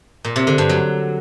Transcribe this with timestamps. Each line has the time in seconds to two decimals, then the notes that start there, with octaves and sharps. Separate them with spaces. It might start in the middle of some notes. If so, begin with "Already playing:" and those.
0.25 A#2
0.36 C3
0.47 D3
0.58 G2
0.69 F#3